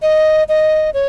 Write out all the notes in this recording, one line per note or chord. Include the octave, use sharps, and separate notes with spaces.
D#5
D#5
C#5